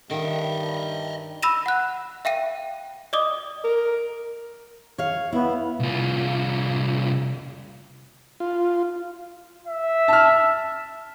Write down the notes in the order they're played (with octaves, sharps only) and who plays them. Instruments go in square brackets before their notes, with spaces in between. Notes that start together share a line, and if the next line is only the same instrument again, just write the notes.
[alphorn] G2 [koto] D#3 [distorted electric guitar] D#5 E5
[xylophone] B5 E6 A#6 D#7 E7
F#5 F#6
E5 F5 G5 D#7
D5 D#5 D6 D#6
[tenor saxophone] A#4
[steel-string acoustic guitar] C#5 F5
[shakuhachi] B3 [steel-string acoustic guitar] E4
[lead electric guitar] C2 F4
[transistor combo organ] F4
[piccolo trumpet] E5
[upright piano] A5 F6